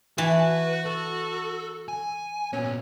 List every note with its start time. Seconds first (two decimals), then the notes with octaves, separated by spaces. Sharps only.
0.18 E3 F#4 B4 A5
0.86 A4
1.88 G#5
2.53 A#2 B3 C#4